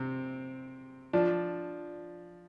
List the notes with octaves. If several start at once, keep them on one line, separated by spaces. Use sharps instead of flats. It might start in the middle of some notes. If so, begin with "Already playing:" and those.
Already playing: C3 C4
F3 D4